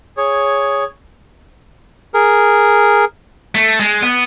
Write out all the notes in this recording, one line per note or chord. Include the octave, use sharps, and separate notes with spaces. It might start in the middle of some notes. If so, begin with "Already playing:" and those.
G#4 C#5
G#4 A#4
A3
G#3
B3